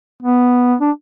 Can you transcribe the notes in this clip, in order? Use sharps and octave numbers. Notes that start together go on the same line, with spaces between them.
B3
D4